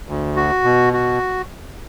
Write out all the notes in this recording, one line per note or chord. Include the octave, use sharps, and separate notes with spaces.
D2
F#4
B2
F#4